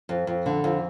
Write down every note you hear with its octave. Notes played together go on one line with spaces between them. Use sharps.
F2
F2
D3
F2